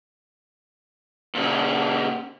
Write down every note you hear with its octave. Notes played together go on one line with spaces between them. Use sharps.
A#2 C#3